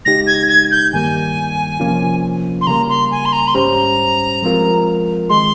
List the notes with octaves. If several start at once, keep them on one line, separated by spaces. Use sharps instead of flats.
C#2 C#3 G#3 D#4 G4 A#6
G#6
G#6
G6
G2 D#3 G3 A#3 G#5
C3 F3 A#3 C#4 F4
C6
C#3 G3 A#3 A#5
C6
G#5
C6
A#5
C6
G#2 G3 C#4 G4 C5 A#5
F3 G#3 C4 F4 A#4
D#3 G#3 C6